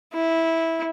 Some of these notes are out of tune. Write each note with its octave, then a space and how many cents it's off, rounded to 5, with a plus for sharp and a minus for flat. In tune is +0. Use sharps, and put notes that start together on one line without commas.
E4 -10